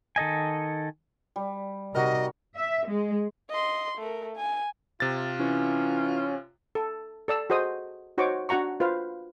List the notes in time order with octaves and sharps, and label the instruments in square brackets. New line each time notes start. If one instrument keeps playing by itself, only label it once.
[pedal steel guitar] D#3 A4 D#5 G#5
[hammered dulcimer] G3
[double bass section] C3 [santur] D#4 F#4 A#4 [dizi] D#5
[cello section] E5
G#3
[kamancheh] D#5 C6
A3 A#4
G#5
[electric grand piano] C3 A6 [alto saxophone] F4
[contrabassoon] E3 [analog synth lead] C#4
[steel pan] A4
A4 D5 E6
F#4 G#4 C5 D#5 D#6
D#4 F#4 C5 C#5 C#6 D6
D4 F#4 F#5 A#5 C#6
F4 B4 C5 F5